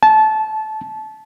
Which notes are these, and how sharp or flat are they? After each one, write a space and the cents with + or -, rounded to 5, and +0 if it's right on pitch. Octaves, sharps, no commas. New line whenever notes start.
A5 -20